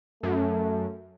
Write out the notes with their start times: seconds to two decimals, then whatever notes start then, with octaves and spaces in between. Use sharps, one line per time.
0.23 F#2 A3